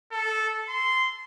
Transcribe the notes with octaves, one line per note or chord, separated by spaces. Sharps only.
A4
C6